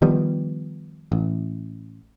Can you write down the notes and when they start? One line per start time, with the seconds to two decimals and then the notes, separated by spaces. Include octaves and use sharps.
0.02 D#3 F3 G3 B3
1.12 A1